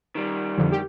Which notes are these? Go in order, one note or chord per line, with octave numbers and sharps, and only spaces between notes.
D#3 G3
F2 D3
G4